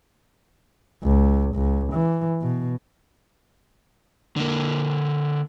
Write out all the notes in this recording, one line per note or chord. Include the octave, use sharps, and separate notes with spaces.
C#2
C#2
E3
B2
D3 A#3